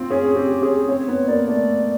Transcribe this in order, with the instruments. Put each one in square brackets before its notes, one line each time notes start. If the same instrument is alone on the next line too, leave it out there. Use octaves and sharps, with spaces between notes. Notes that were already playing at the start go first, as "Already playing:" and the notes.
Already playing: [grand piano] C4 F4
[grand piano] C#4 [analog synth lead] G#4
[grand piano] C4 [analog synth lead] G4
[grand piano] C#4 [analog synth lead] G#4
[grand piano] C4 [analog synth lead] C#5
[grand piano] B3
[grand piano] A#3 [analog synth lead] D5
[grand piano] A3